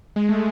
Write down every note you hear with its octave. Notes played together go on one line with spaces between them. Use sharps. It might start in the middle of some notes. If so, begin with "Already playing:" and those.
G#3
A3